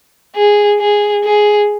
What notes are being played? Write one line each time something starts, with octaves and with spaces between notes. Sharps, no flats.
G#4
G#4
G#4